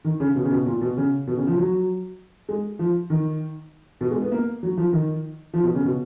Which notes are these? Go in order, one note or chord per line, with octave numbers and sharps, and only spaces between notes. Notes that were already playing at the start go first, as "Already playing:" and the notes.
D#3
C#3
B2
C#3
B2
A#2
B2
C#3
B2
C#3
F3
F#3
G#3
F3
D#3
B2
G#3
B3
A#3
F#3
F3
D#3
F3
B2
C#3
B2